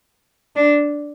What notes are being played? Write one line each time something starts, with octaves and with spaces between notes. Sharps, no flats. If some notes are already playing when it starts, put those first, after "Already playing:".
D4